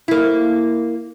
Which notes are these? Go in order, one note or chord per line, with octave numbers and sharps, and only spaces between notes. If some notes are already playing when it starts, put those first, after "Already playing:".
A#3 E4